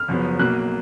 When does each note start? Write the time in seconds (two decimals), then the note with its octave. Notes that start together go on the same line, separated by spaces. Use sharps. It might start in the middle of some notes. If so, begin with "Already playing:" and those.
Already playing: F6
0.08 F#1 F#2 F3 B3
0.39 B1 B2 A#3 F#6